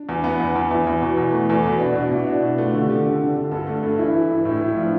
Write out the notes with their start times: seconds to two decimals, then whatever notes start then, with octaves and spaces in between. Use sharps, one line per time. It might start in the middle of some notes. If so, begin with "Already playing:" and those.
Already playing: D4
0.09 E2
0.24 B3
0.40 E2
0.55 E2
0.71 E2 E4
0.87 E2
1.02 B2
1.17 E2
1.33 A3
1.49 E2
1.65 B2
1.80 D4
1.95 B2
2.11 B2 E4
2.27 D4
2.42 B2
2.58 A3 F4
2.74 D3
2.81 G4
2.89 D3
3.05 D3 A4
3.21 D3
3.36 D3
3.51 G2 A4
3.67 A3
3.83 G2
3.98 E3 E4
4.14 E3
4.30 G2
4.45 A2 E4
4.61 A2
4.69 D4
4.77 F3